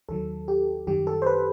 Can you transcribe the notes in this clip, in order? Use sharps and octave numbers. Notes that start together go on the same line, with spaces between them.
D#2 D#3 F#3 A4
G4
F#2 D#3 G3 G4
A4
C5
B4